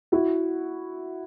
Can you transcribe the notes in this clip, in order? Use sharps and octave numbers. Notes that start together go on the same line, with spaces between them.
E4 F#4